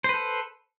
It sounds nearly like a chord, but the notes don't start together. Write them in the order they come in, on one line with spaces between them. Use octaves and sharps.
C5 B4 A4